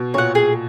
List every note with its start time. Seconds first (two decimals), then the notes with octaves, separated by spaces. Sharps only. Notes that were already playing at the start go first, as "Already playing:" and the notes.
Already playing: B2
0.14 A#2 C#5 F#5
0.35 G#4